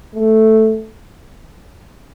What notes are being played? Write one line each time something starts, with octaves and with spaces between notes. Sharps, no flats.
A3